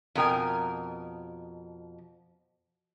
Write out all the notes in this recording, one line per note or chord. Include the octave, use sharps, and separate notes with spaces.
F2 B2 A#4 G5 G#5